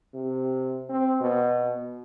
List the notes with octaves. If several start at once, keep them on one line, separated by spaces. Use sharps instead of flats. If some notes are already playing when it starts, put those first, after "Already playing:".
C3
C4
B2